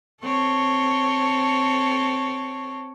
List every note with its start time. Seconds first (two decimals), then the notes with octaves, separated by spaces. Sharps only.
0.24 C4 A4 C#5